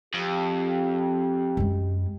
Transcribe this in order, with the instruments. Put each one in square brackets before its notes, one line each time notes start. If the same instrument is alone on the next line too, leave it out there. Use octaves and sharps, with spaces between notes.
[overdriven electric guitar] F2 [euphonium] G4
[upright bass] F#2 G#3